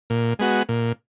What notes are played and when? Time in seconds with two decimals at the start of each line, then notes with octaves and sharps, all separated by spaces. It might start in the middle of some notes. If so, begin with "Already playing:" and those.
0.10 A#2
0.39 G#3 B3 F#4
0.69 A#2